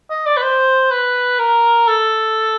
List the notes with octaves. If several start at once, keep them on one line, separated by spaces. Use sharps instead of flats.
D#5
D5
B4
C5
B4
A#4
A4